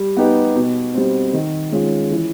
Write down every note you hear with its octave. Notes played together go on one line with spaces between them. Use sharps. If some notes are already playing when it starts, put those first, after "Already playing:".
Already playing: G3
B3 D#4 G4 B4
B2
G3 C4
D#3
G#3 C#4 F4
E3